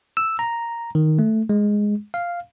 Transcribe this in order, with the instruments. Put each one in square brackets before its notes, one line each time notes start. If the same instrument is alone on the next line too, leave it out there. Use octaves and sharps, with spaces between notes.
[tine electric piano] E6
A#5
D#3
A3
G#3
F5